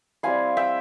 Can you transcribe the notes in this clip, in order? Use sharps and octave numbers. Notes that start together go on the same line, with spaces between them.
G3 C4 E4 F5 G#5
E5 G5